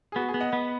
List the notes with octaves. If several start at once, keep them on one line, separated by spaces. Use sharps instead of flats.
G#4
B3 F#4
G#4
B3
D#5 F#5
B3